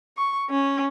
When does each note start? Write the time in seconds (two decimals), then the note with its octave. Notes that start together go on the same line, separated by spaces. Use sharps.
0.17 C#6
0.50 C#4